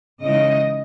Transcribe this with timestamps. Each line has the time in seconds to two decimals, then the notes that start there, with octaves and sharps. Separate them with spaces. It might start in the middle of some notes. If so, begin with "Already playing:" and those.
0.22 C#3 E3 G#3 D#4 D#5